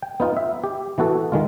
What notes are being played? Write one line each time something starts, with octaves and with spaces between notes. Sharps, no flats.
G5
B3 D#4 F4
E5
G4
E3 B3 F#4 A4
D#3 G#3 F4